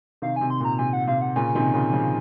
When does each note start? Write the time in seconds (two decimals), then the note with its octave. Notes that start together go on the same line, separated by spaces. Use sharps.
0.22 C3 D#3 F5
0.36 C3 G#5
0.50 C6
0.60 A#2 A#5
0.79 C3 G#5
0.93 F#5
1.07 C3 F5
1.21 F#5
1.36 A#2 C#3 G#5
1.55 C3 D#3
1.74 A#2 C#3
1.93 C#3 F3